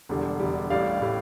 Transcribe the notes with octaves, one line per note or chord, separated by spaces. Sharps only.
E1 E2 D3 G3
E1 E2 D3 G3
A1 A2 G3 D5 F5
A2 G3